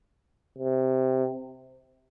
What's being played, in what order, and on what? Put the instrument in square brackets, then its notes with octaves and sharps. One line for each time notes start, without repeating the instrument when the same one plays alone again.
[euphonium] C3